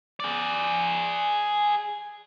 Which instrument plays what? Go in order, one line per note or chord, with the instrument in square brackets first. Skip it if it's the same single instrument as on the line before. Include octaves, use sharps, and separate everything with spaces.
[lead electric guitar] G#4 D5